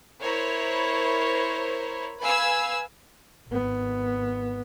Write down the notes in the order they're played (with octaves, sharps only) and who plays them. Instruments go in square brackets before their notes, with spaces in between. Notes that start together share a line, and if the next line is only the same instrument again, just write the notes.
[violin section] E4 A#4 C5 C#5
B4 F5 G#5 E6
[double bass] G#1 B3